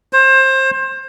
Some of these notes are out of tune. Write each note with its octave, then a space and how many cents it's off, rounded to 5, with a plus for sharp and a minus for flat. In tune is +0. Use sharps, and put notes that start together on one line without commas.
C5 +25